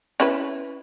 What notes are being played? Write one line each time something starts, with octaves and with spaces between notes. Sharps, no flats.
C#4 E4 B4